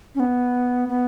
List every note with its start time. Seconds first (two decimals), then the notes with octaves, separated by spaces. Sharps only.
0.15 C#4
0.20 B3
0.89 B3